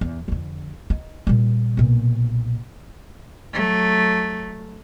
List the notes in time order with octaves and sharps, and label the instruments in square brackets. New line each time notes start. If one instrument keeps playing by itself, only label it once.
[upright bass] E2
F2 D3
D#4
A#2 G3
B1 A#2
[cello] F#3 A3